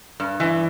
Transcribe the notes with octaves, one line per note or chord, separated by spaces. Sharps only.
G2
E3